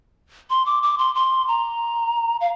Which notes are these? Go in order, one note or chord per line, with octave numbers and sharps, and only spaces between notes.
C6
D6
D6
C6
C6
A#5
F5